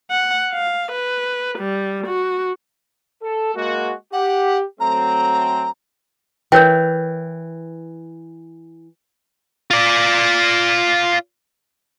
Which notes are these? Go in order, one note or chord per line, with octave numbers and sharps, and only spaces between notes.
F#5
F5
B4
G3
F#4
A4
G#3 A#3 F#4
G4 F#5
F#3 A3 C4 A#5
E3 A#4 B4 C#5 G5 G6
F4 D5